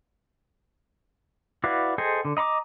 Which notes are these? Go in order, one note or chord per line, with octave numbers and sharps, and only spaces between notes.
E4 F#4 B4 D5 F5
G#4 A4 C5 D#5 G5
D3
D#5 A#5 B5 D6